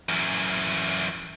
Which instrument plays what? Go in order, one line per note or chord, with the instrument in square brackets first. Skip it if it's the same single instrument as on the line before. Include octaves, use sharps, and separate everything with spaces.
[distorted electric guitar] F#2 E3